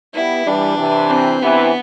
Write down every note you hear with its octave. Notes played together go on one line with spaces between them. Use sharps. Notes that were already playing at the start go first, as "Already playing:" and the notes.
G3 B3 E4
E3 G3 D4
C3 E3
C4
C3 E3 B3